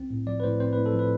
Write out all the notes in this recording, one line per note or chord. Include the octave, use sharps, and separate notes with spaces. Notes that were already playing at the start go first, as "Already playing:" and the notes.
Already playing: C2 C4
A2
F3 D5
B4
A2 C5
C4 C5
A2 B4
A4
F3
B4